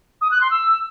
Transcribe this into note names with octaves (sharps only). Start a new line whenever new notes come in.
D#6
F#6
C6
E6